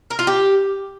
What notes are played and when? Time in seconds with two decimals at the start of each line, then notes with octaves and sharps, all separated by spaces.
0.10 A#4
0.19 F4
0.27 G4